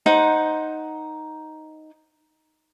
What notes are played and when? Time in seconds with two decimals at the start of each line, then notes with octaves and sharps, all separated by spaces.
0.06 D#4 C5 F#5